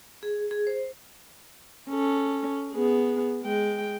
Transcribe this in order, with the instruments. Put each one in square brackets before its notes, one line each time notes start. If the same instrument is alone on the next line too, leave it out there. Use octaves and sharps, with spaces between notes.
[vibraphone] G#4
G#4
C5
[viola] C#4 A4
B3 G#4
G#3 G5